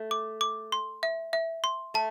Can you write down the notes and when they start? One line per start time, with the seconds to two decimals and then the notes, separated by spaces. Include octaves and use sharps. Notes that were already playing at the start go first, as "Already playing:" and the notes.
Already playing: A3
0.11 D6
0.41 D6
0.72 C6
1.03 E5
1.33 E5
1.64 C6
1.94 A3 A5